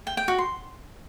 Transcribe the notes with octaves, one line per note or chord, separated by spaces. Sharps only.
G5
G5
F#4
C6